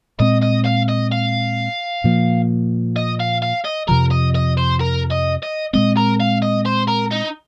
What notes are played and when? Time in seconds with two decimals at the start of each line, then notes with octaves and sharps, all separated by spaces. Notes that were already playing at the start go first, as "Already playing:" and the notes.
0.20 A#2 G#3 C4 D#5
0.43 D#5
0.66 F5
0.89 D#5
1.12 F5
2.04 A#2 F3 A#3
2.96 D#5
3.20 F5
3.42 F5
3.65 D#5
3.88 F2 C3 F3 A#4
4.11 D#5
4.35 D#5
4.57 C5
4.81 A#4
5.11 D#5
5.43 D#5
5.73 A#2 G#3 C4 D#5
5.97 A#4
6.20 F5
6.42 D#5
6.66 C5
6.88 A#4
7.12 D#4